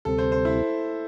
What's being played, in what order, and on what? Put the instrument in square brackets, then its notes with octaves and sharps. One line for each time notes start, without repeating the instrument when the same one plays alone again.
[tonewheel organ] D2 C3 G3 C4 [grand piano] A4
[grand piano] C5
C5
E4